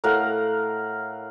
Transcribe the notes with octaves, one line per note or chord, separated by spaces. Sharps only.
A2 A#4 F5 F#5